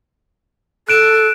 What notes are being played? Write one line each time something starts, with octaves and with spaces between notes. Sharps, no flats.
A4 F#6 D7 E7